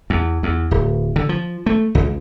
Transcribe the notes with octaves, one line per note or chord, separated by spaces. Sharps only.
E2
E2
D1
D3
F3
A3
C#2